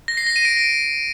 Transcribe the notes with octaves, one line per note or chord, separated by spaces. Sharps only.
A#6
C7
A#6
D#7
D7